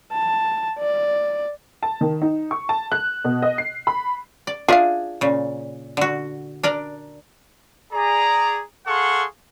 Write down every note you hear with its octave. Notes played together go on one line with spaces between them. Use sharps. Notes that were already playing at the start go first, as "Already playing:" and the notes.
A5
D5
A5
D#3
D#4
C#6
A5
F#6
B2
D#5
C7
B5
D5
D4 F4 G#4 E5 F5
A#2 C#3
D3 F#4
D4 A#4 D5
G#4 D5 A#5
G#4 A4 F5 F#5 C6 C#6